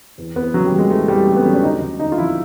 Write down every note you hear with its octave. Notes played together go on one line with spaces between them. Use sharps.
E2
E2 B3
C#3 F#3
G3
F#3
G#3
E2 A3
E2 G3
C#3 A3
B3
F#3 C#4
D4
D#2 D#4
D#2
D3 D#4
F4
F3 E4